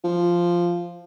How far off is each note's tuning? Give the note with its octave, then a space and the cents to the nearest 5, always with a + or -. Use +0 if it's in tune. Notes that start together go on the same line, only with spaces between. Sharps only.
F3 -5